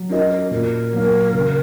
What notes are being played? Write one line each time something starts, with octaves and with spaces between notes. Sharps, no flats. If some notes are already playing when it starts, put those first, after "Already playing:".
Already playing: F#3
C#4 F#4 A#4 D#5
A#4
A#2 A#4
F#3 A#3
C#3